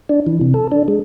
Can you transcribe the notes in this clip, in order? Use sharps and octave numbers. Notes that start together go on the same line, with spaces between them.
D4
E3
C3
A4
D4
G#3